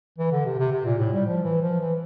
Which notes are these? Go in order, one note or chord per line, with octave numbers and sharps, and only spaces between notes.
E3
D3
C3
C3
C3
A#2
A2
G3
F3
E3
F3
E3